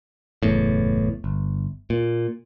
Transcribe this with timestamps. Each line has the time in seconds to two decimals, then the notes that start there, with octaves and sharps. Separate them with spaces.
0.43 F#1 E2 A2
1.24 G1
1.90 A#2